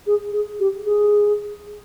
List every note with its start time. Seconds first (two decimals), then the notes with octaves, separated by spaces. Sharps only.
0.07 G#4
0.32 G#4
0.60 G4
0.85 G#4